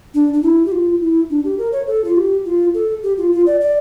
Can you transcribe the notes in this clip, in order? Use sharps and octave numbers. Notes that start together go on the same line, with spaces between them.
D4
D4
E4
G4
F4
E4
D4
G4
A#4
C#5
A4
F4
G4
F4
A4
G4
F4
F4
D5
D5